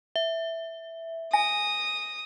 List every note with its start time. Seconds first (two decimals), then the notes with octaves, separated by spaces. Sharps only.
0.16 E5
1.33 G#5 D#6 A#6